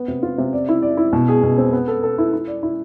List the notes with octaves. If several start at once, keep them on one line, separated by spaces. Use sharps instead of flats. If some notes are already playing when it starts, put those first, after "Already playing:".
Already playing: B3
C3
F4
C3
D5
E4
D5
E4
B2
G#4
B2
C4
B3
A4
A4
E4
E4
D5
E4